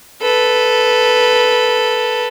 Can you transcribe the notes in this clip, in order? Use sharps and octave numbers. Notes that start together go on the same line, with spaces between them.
A4 B4